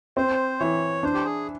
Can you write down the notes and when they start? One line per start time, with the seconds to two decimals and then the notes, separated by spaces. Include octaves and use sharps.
0.17 C4 C5
0.59 E3 C#5
1.03 D4 C5
1.14 G4
1.25 G#4